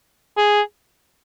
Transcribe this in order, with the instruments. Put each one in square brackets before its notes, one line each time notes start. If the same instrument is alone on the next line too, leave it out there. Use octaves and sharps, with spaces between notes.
[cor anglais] G#4